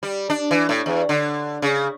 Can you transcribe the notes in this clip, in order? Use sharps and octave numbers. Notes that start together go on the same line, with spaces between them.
G3
D4
E3
A2
E2
D3
C#3